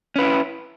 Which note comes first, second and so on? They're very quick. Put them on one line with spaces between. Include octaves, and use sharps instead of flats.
C#4 B4 E4